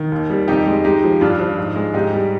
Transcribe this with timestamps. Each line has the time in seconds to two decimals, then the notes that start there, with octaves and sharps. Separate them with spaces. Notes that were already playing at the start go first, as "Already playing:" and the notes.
Already playing: D#3
0.12 D#2
0.30 G3
0.48 F2 D#4 G4
0.67 G#3
0.84 G#3 D#4 G4
1.04 F3
1.21 G2 D4 F4
1.40 F3
1.58 G#2
1.76 G#3
1.94 G#2 D#4 G4
2.13 G3